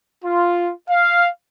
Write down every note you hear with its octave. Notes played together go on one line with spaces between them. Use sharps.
F4
F5